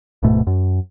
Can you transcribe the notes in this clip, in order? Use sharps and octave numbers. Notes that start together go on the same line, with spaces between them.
D1 G#2 B2 A3
F#2